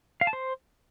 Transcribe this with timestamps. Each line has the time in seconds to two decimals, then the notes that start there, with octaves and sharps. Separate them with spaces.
0.21 F5
0.27 A5
0.33 C5